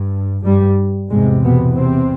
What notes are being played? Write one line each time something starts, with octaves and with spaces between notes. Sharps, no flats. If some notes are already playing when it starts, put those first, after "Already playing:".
Already playing: G2
G2 G3
E2 G#2 C3 G#3
B2 B3
C3 C4